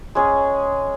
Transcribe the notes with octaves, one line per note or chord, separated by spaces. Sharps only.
G#3 C#4 G#4